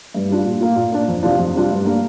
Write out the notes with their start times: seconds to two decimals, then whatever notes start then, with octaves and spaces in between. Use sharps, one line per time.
0.14 G2
0.29 G3 D4 F4
0.45 A#2
0.60 A#3 F4
0.76 A#2
0.92 A#3 D4
1.08 F2
1.23 C3 F3 D4 F4
1.39 F2
1.54 C3 G3 D4 F4
1.70 G2
1.86 G3 A#3 D4